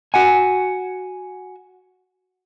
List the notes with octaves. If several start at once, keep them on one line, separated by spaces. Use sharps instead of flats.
F#4 F#5 G#5